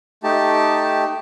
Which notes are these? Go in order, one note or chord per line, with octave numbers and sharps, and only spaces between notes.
A3 D#4 G4 A5